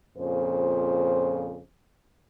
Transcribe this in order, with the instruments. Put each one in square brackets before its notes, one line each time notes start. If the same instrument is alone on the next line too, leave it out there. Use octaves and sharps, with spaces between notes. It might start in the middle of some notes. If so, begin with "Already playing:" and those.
[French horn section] F2 A#2 C#3 C5